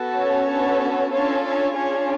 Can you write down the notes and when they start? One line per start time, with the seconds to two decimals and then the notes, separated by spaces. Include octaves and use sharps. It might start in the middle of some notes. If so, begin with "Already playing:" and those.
Already playing: B3 F#4 A4
0.18 C#4 C#5
0.51 B3 D4 F#4 A4
1.12 C#4 D4 F4 A4 C#5
1.45 C#4 C#5
1.75 C#4 D4 F4 G#4 C#5